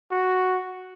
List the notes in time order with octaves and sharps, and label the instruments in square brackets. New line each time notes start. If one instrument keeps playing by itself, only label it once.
[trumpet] F#4